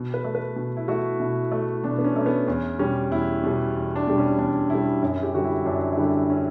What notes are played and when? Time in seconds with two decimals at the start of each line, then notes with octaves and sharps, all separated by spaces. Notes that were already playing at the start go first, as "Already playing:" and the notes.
Already playing: B2
0.14 B4
0.24 A3
0.35 B4
0.56 B2
0.77 E4
0.88 A3 F#4
1.20 B2 E4
1.52 A3
1.84 B2 D4
1.98 B3
2.04 C#4
2.16 A3 C#4
2.26 B3
2.47 E2 C#4
2.79 B2 G3 C#4
3.11 E2 E4
3.43 B2 G3
3.75 E2
3.96 D4
4.07 B2 G3
4.18 C#4
4.38 E2 D4
4.70 B2 G3 E4
5.03 F#2 E4
5.23 G4
5.34 D3 G3 F#4
5.44 E4
5.66 F#2 D4
5.93 E4
5.98 D3 G3 D4
6.30 C#4